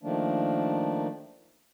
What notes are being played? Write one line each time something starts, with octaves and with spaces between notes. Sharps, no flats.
D#3 F3 A3 A#3 D4